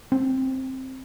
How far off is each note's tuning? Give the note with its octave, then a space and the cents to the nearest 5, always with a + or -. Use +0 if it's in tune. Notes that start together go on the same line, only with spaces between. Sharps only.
C4 +10